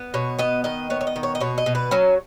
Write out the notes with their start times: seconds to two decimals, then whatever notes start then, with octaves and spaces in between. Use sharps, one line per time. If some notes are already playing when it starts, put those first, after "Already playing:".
Already playing: B3
0.14 B2 C#5
0.39 B3 D#5
0.64 D#3 D#5
0.90 B3 C#5
1.01 C#5
1.07 D#5
1.16 D#3
1.23 C#5
1.35 D#5
1.40 B2 C#5
1.58 D#5
1.66 B2
1.75 B4
1.91 F#3 C#4